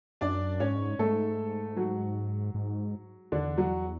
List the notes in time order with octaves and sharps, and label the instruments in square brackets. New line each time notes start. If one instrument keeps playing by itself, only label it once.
[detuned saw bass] F#2 [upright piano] D4 D5
[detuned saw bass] G#2 [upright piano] C#4 C#5
[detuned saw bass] G#2 [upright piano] A3 A4
[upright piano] F#3 F#4
[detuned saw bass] G#2
[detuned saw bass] E2 [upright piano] D3 D4
[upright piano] F#3 F#4